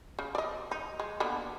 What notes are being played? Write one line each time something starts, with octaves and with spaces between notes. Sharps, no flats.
C#3
D5 D#5
D#4
G#3
D3 A#3 B3